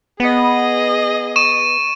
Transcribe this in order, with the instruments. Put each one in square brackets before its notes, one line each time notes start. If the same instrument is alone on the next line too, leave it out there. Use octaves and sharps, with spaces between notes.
[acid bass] B3 [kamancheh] G#4 D#5
[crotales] C#6 D#7 E7